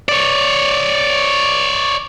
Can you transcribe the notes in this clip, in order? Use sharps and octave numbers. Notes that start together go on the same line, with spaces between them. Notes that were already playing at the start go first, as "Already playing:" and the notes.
C#5 D5